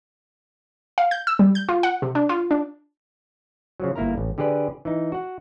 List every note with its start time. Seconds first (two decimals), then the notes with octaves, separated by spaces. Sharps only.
0.98 F5
1.11 G6
1.27 E6
1.39 G3
1.55 G6
1.69 F4
1.83 F#5
2.02 C3
2.15 D4
2.29 F4
2.51 D4
3.80 C#3 F3 F#3
3.96 G1 A#3 E4 A#4 A#5
4.18 A1
4.38 D3 G4 G#4 B4 D5
4.85 E3 D#4
5.12 F#4 F#5